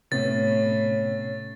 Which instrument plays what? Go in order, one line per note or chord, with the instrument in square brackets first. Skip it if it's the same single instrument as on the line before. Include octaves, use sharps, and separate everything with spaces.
[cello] A2 [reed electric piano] C3 B3 C#4 [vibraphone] C#5 [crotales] A6